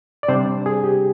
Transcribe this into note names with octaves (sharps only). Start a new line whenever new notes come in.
D5
C3 G3 C4 D4 C5
G#4
G4